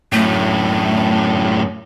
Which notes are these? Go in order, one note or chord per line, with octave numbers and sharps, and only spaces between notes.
F#2 A2 A3